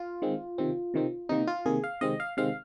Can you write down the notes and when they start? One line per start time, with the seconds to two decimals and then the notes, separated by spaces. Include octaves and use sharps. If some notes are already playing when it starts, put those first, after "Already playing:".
Already playing: F4
0.22 D#3 G#3 C4
0.58 C3 D#3 C4
0.94 C3 D#3 C4
1.29 C3 D#3 A#3 D#4
1.47 F4
1.66 C3 D#3 A#3 G#4
1.84 F5
2.01 C3 D#3 G#3 C4 D#5
2.20 F5
2.37 C3 D#3 G#3 C4 F5